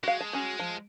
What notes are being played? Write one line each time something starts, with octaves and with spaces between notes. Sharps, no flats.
G#3 F#4 F5
A5
C#4 F#4
F3